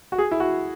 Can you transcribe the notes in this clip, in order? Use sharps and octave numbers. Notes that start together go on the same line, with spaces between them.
F#4
G#4
E4
F#4